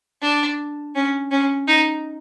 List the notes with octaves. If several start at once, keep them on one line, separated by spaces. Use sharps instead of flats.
D4
C#4
C#4
D#4